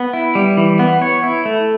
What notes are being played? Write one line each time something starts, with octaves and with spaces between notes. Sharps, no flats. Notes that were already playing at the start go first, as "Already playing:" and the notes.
Already playing: B3
E4
G3
E3
B3
C#5
E4
A3